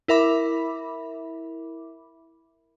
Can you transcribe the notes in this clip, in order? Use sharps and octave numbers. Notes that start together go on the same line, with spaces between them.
E4 A#4 E5 B5 D6